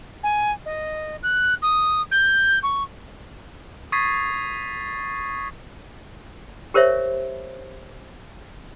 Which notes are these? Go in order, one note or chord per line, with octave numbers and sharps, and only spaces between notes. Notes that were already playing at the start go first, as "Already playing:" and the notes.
G#5
D#5
F#6
D#6
G6
C#6
C#6 D#6 G#6 A6 B6 C7
G4 A#4 C5 C#5 E5